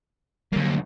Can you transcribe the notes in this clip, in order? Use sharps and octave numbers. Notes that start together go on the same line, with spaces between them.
D2 F#3 G3 A#3